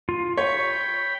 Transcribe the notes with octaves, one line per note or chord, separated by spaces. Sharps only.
F4
C#5 G5 B5 C#6